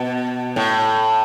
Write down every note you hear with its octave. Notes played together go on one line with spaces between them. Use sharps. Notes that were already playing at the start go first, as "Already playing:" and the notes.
Already playing: B2
A2